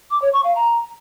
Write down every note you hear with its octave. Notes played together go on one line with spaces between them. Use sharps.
D6
C#5
C#6
F5
A#5